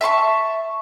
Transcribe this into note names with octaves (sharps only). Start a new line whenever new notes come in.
E5 A5 C6 C#6